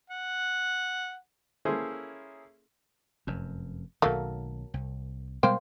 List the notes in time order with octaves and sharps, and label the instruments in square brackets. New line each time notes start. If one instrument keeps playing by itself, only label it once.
[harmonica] F#5
[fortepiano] A#3 C#4 E4 G#4 A4 C5
[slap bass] F1 F#2
[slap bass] B1 D#3 [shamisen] F#3 A3 A#3
[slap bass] C2
[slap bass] B2 G3 G#3 [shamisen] A#3 C5 G5